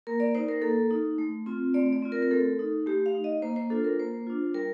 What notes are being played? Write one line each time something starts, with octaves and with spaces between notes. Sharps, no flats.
A#3 A#4
D5
D#4 C5
A#4
A#3 A4
D#4
A3
C4 F4
A3 D5
D5
C4 F4
A#4
A#4
A3 A4
D#4
A3 G4
F5
D#4
D#5
A#3 C5
C5
D4 F4 A4
A#4
A#3 C5
D4 F4
G3 A#4